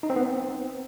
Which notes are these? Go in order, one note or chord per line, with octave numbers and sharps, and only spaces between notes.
D#4
C4
B3
C4